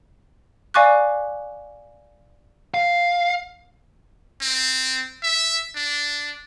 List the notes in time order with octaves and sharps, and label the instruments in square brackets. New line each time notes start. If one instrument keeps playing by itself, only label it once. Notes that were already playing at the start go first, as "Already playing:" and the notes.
[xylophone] D5 F5 G#5 C#6 D6 F#6
[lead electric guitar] F5
[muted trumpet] C4
E5
D4